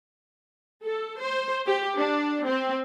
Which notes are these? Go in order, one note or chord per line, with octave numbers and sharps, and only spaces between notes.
A4
C5
G4
D4
C4